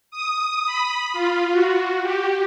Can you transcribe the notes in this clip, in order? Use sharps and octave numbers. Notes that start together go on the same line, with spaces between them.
D#6
B5
F4
F#4
G4